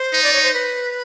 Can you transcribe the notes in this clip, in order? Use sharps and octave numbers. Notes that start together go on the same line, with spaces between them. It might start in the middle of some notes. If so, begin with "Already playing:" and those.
Already playing: C5
D#4
D5
C#5
C5
B4